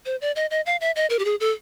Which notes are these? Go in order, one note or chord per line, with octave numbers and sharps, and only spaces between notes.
C5
D5
D#5
D#5
F5
E5
D#5
A#4
G4
G#4
A4